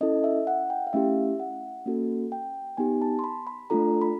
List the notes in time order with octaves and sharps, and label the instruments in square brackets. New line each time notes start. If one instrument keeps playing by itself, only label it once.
[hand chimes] C#4 E4 A4 D#5
E5
F#5
G5
F5
A3 C#4 E4 G4 E5
F#5
A#3 C#4 F#4 A4
G5
B3 D#4 G4 G#5
A5
C6
B5
B5
A3 D4 F4 A4 A#5
B5